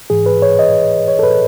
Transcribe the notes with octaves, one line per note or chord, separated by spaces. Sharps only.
G#2 E3 G#4
B4
C#5
D#5
C#5
A4
B4